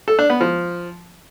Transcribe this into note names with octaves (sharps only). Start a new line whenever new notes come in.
A4
D4
B3
F3